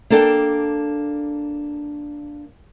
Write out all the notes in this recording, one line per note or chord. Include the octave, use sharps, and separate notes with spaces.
A#3 D4 A4 D5 G5